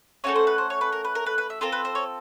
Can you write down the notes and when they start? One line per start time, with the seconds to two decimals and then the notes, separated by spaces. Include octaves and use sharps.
0.24 A3 C#4 F#4 A4 C#5
0.36 C5
0.47 B4
0.58 C5
0.70 C#5
0.81 B4
0.93 A#4
1.04 B4
1.15 A#4
1.26 B4
1.38 B4
1.50 E5
1.61 C4 F4 A4 A#4
1.72 B4
1.85 C5
1.95 C#5